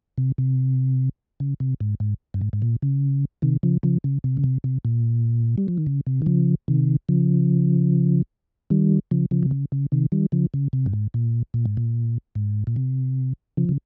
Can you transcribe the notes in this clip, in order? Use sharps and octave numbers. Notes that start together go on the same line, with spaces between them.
C3
C3
C#3
C3
G#2
G#2
G2
G#2
G#2
A#2
C#3
C3 D#3
C#3 F3
C#3 F3
C#3
C3
C#3
C3
C3
A#2
G3
F3
D#3
C#3
C3
D#3
C#3 F3
C3 D#3
C#3 F3
D#3 G3
C#3 F3
C#3 F3
C3
C#3
C#3
C3 D#3
D#3 G3
C#3 F3
C#3
C3
G2
G#2
A#2
A#2
G#2
A#2
G#2
A#2
C3
C#3 F3
C#3